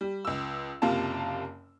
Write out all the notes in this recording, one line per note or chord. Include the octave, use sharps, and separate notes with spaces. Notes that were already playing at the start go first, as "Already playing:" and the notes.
G3
C#2 E6
F#1 C3 A#3 F4 A5